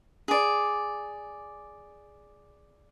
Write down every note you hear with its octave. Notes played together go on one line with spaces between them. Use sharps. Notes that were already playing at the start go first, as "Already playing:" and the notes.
G#4 D5